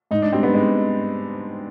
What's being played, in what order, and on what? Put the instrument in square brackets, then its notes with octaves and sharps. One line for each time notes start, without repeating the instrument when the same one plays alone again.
[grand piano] G#2 [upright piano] D#4
[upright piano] D4
[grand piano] G3 D4 [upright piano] C4
[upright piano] B3
[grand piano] G#2 [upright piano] G#3